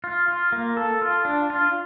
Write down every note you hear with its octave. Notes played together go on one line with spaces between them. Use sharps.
F4
F4
A#3
A4
F4
D4
F4